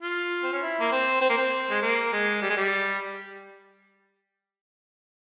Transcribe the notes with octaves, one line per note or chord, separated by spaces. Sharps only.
F4
C4
C#4
E4
A#3
C4
C4
A#3
C4
G#3
A#3
G#3
G3
G#3
G3